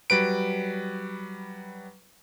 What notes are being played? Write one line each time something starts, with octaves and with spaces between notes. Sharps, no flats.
F#3 G3 B4 D7